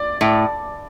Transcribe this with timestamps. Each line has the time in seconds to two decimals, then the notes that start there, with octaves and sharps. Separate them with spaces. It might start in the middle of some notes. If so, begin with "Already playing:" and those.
Already playing: D5
0.21 A2